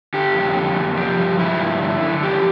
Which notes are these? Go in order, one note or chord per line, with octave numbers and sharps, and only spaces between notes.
D3 G4
F2
D3
F2
F3 G4
G2
F3 E4
G2
D3
D3
F3 G4